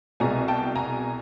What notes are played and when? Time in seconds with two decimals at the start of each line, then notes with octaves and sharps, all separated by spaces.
0.20 C2 B2 G#3 G#5 A#5
0.48 G5 A5
0.75 G#5 A#5